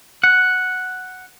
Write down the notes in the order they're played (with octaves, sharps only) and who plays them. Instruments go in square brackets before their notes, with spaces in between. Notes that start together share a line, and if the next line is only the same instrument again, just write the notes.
[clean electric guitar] F#5